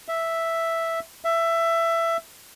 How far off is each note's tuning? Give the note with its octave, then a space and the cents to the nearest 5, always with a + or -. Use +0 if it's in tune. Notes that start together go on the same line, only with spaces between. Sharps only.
E5 +0
E5 +15